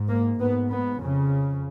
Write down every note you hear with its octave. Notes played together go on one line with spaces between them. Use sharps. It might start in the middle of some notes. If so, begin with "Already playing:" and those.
Already playing: G#2
A#3
G#2 B3
B3
F2 C#3